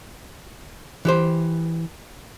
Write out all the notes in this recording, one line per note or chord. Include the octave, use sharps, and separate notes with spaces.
E3 G4 C5